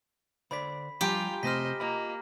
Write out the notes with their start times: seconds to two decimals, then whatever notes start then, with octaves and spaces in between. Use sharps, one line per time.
0.51 D3 C5 D5 B5 B6
1.01 F3 G3 F4 G4 G#5 A#5 D7
1.43 C3 A3 C4 C5 D#5 F6 A#6 B6
1.80 A#3 F4 D#5 B5